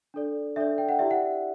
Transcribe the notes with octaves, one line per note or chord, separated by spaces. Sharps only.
D4 A4 D5
D4 A4 D5 E5
G5
F#5
E4 G4 D5 E5
F#5